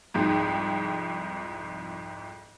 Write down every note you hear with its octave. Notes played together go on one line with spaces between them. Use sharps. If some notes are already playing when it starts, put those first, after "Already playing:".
C2 F2 G#2